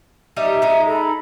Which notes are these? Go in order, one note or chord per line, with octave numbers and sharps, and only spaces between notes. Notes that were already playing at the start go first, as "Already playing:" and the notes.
G3 D#4 G4 E5
G#3 D#4
A4 A#5 B5